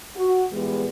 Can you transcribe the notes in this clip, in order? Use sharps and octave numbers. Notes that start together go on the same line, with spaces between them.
F#4
E2 A#2 E3 G3 G#3 B3